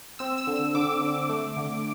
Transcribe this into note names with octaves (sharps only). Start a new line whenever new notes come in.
C4 E6
E6
D3
E6
D3 D6
D3
A3
D3